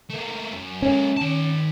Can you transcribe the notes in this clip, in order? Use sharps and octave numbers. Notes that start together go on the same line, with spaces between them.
A3 A#3
F#2
G#3 A#3 C#4
D#3 A5